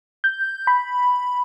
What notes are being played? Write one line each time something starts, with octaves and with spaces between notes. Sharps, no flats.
G6
B5